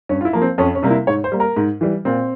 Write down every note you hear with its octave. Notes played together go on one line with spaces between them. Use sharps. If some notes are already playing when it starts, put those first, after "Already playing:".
G2 C#4
F4
E4
F3 A#3
C4
F2 C#4
C#4
C3 G3 A#3
E4
G#2 C#5
C5
G3 A#3
A#4
G#2
E3 G3
A#2 C4